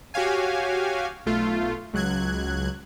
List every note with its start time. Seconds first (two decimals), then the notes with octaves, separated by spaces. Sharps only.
0.14 F#4 G4 C#5 F5 G#5
1.26 B1 A3 F4
1.94 C#2 F#3 F#6 G#6